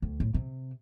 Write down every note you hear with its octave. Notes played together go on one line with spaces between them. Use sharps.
D2
A2
C3